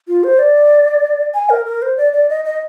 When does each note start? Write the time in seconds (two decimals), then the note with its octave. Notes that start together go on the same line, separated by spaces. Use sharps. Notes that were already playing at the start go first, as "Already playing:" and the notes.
0.08 F4
0.24 C5
0.39 D5
1.34 G#5
1.50 A#4
1.66 A#4
1.82 C5
1.97 D5
2.13 D5
2.29 D#5
2.45 D#5